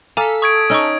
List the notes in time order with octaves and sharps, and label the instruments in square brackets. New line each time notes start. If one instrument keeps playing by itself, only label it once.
[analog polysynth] A4 B6 [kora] F5 [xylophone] G#5 A#5 D6
[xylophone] C#6 [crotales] D#6 G#6 D7
[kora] C#4 D#4 [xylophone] C#6 E6